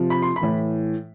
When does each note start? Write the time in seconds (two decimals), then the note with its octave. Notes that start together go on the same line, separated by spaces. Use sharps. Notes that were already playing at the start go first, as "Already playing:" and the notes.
Already playing: C3 F3
0.10 B5
0.22 C6
0.36 B5
0.41 A2 E3